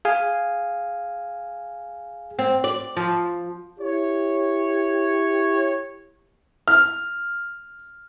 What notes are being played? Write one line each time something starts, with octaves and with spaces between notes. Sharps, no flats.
G#4 F5 G#5
C4
D5
F3
E4 G4 C#5
F6